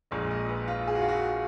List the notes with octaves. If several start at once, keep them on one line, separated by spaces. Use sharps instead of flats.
A#1 A#2 G#3 D#5
D#5
B4
F4
G#4
F#4
F4
F#4